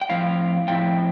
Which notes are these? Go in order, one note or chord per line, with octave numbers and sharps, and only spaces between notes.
G5
A2 F3 C4 E4 F5
A2 F3 C4 E4 G5